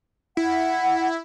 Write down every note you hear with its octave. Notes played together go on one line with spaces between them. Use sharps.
E4 F#5